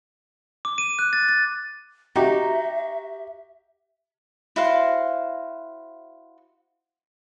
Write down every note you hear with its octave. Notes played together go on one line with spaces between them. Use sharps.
D6
D#7
F#6
A6
A6
D#4 F#4 G4 E5
E4 F#4 C5 F5